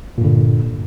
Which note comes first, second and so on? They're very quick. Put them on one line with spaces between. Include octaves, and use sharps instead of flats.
A#2 G2 D3